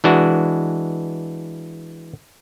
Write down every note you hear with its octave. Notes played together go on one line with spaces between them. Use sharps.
E3 G#3 D4 F#4